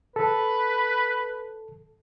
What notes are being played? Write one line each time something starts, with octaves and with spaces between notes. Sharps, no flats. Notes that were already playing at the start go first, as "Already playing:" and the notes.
A4 B4